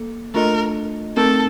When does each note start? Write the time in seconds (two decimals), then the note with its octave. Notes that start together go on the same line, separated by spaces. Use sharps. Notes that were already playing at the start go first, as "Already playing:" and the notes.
Already playing: A#3 A4
0.34 A3 D4 F4 A4 A#4 D#5
1.17 A3 C4 D#4 A4 A#4